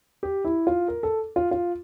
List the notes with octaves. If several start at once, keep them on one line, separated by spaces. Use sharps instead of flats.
G4
E4
F4
A#4
A4
F4
F4